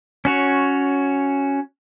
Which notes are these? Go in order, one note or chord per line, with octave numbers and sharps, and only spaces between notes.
C#4 F#4 C#5